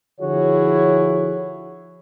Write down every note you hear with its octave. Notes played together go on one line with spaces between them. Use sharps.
D3 F3 E4 F#4 G#4 C#5